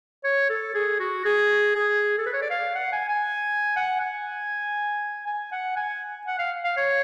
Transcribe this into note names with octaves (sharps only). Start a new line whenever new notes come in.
C#5
A4
G#4
F#4
G#4
G#4
A4
B4
C#5
D5
F5
F#5
G#5
G#5
F#5
G#5
G#5
F#5
G#5
F#5
F5
F5
C#5